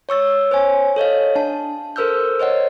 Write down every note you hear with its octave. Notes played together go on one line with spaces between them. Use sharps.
C#5 C#6 E6 A6
C5 C#5 G#5
A4 C#5 D#5 F5
D4 A5
A4 A#4 C5 E6 F6 G6
C5 C#5 D#5 F#5